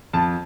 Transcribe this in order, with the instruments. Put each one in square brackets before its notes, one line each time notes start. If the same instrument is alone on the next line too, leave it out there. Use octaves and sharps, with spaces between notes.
[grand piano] F2 A5